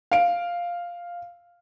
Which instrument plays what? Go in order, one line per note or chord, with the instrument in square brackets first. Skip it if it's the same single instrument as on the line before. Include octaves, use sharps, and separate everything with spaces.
[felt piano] F5 D7